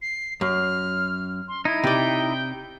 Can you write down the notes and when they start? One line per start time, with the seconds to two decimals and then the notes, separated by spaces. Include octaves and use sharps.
0.02 C7
0.41 F#2 F6
1.48 C6
1.65 D#4 E4 G#6
1.84 C3 D5 G5